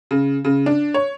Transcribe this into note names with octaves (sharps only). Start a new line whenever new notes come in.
C#3
C#3
D4
C#5